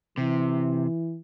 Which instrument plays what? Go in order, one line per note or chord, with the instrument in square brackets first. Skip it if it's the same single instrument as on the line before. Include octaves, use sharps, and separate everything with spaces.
[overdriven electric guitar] C3 [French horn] E3